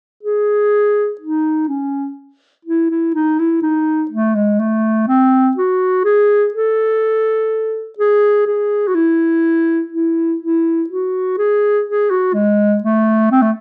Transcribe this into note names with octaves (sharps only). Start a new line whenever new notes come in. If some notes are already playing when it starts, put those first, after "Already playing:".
G#4
D#4
C#4
E4
E4
D#4
E4
D#4
A3
G#3
A3
C4
F#4
G#4
A4
G#4
G#4
F#4
E4
E4
E4
F#4
G#4
G#4
F#4
G#3
A3
C4
A3